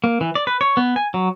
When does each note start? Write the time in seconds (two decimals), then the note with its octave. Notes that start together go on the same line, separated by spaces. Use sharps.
0.04 A#3
0.21 E3
0.35 D5
0.47 B4
0.61 C#5
0.77 B3
0.96 G#5
1.14 F#3